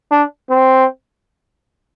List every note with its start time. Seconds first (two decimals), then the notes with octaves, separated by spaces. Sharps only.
0.11 D4
0.50 C4